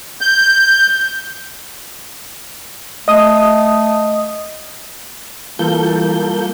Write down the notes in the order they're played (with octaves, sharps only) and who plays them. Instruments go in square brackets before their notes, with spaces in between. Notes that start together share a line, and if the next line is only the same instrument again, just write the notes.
[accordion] G6
[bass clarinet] A3 [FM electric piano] D#5 D#6
[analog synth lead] E3 [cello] G3 [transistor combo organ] A#3 [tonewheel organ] F4 A4 G6